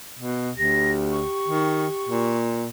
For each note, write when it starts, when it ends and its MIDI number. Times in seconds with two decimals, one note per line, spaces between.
0.19 0.51 47
0.57 1.23 38
0.57 2.35 67
0.57 0.90 94
1.11 2.36 85
1.48 1.87 51
2.09 2.68 46